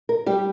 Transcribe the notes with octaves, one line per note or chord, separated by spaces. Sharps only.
A#4
G3 G4